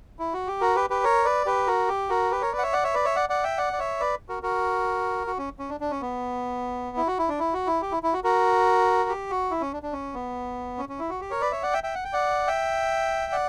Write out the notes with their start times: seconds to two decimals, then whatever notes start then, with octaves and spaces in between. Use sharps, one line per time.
0.19 E4
0.34 F#4
0.47 G4
0.61 F#4 A#4
0.75 G4 B4
0.90 G4 B4
1.04 A#4 C#5
1.25 B4 D5
1.46 G4 B4
1.67 F#4 A#4
1.88 G4
2.09 F#4 A#4
2.31 G4 B4
2.42 A#4 C#5
2.52 B4 D5
2.58 F#5
2.63 C#5 E5
2.73 D5 F#5
2.84 C#5 E5
2.94 B4 D5
3.05 C#5 E5
3.16 D5 F#5
3.29 D5 F#5
3.44 E5 G5
3.58 D5 F#5
3.73 D5
3.79 C#5 E5
4.00 B4 D5
4.29 F#4 A#4
4.43 F#4 A#4
5.27 F#4
5.38 C#4
5.59 C#4
5.69 D4
5.80 D4
5.91 C#4
6.02 B3
6.97 E4
7.07 F#4
7.18 E4
7.29 D4
7.39 E4
7.53 F#4
7.67 E4
7.82 G4
7.92 E4
8.03 E4
8.13 F#4
8.24 F#4 A#4
9.09 G4
9.30 F#4
9.51 E4
9.61 C#4
9.73 D4
9.83 D4
9.93 C#4
10.14 B3
10.78 C#4
10.89 C#4
10.99 E4
11.10 F#4
11.21 G4
11.31 A#4 C#5
11.41 B4 D5
11.52 C#5 E5
11.63 D5 F#5
11.73 E5 G5
11.84 E5 G5
11.95 F#5
12.04 G5
12.13 D5 F#5
12.47 E5 G5
13.32 D5 F#5